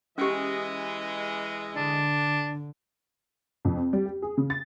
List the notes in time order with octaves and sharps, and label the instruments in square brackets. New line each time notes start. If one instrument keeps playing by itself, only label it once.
[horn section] E3 G#3 D#5 [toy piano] C#4 G4
[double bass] D3 [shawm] D4
[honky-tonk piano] F2
C4
G3
G4
G#4
C#3
A6